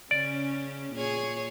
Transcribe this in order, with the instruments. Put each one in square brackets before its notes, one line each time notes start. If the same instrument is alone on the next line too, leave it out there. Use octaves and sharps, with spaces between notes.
[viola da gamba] C#3 C#4 [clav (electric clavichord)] D5
[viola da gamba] A#2 G#4 C#5